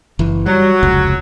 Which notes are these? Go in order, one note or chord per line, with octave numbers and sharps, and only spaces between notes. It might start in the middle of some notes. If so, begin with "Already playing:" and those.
F#1 E3
F#3 G3
F1 C#2